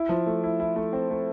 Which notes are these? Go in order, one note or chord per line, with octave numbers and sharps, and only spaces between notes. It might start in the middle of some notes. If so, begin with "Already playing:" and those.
Already playing: E4
F3
A3
E4
E4
A3
C4
A3